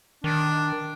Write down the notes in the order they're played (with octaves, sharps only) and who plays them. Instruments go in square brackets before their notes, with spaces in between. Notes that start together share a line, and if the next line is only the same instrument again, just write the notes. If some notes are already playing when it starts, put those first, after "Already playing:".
[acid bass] D#3 [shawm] D4